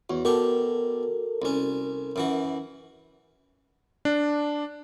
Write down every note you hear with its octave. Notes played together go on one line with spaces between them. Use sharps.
E2 F#4 C#5
B2 F#4 G4 A4 A#4 C#6
C2 C#4
F#2 E3 F#4
D4